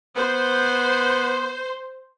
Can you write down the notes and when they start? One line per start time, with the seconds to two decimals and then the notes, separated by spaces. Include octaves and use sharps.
0.17 B3 C5